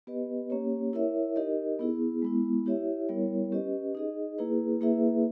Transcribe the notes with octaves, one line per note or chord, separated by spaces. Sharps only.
B3 G4 B4 D#5
A#3 C#4 G4 C#5
E4 A#4 C#5 E5
D#4 G4 A#4 D#5
B3 E4 G#4
G#3 B3 E4
E4 G4 C#5 E5
G3 B3 E4 A#4 C#5
C#4 G4 B4 D#5
D#4 G#4 D#5
A#3 E4 G#4 B4
A#3 E4 G#4 B4 E5